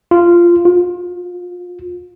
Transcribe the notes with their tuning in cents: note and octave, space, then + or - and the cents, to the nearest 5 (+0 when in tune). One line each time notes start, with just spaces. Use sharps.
F4 -10
F4 +30